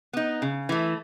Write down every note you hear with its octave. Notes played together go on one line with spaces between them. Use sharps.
B3 D#4
C#3
E3 A3